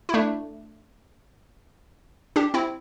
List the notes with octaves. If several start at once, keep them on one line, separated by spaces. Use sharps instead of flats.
E4
A3 D4
D4 G4
C4 E4